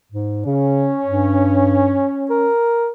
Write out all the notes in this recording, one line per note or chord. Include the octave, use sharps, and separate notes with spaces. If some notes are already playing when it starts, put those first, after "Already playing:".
G#2
C#3 C#4
G2
A#4